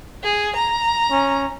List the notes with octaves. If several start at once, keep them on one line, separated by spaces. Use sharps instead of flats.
G#4
A#5
C#4